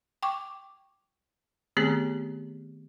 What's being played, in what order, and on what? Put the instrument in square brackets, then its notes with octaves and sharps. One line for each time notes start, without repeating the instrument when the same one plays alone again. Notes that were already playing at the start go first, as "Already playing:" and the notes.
[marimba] G5 C#6 D6
D#3 A3 B3 C4 G4 G#4